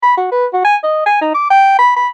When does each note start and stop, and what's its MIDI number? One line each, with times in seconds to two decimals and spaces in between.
0.03 0.16 83
0.17 0.30 66
0.31 0.46 71
0.53 0.61 66
0.65 0.76 80
0.83 1.03 75
1.06 1.18 80
1.21 1.33 63
1.34 1.49 86
1.50 1.77 79
1.79 1.92 83
1.96 2.08 83